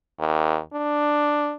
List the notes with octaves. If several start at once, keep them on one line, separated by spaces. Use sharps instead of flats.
D#2
D4